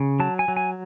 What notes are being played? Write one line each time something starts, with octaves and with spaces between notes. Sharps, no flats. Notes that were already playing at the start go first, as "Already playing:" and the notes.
Already playing: C#3
F#3 A5
G#5
F#3
G#5